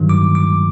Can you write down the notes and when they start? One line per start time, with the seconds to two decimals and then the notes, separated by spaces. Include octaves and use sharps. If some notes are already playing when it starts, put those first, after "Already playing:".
Already playing: G2 D#3 F#3
0.09 D6
0.35 D6